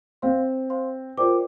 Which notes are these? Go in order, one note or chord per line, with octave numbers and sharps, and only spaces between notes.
C4 C5 F5 C6
C5 F5 C6
F4 A#4 C5 D5 G5 D6